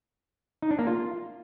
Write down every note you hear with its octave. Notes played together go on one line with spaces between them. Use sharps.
D#4
D4
A#3
F4